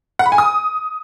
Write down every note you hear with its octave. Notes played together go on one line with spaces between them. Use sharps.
F#5
B5
G#5
D#6